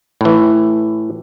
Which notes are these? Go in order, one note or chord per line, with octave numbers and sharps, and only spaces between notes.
A2 E3